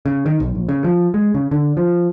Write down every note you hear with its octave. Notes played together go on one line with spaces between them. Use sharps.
C#3
D#3
B1
A#1
C#3
F3
G#3
C#3
D3
F3